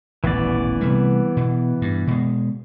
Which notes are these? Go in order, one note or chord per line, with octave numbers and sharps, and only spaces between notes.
D#1 A1 E3 B3 D5
C3 G3 A3
B2
G2
B2 G#3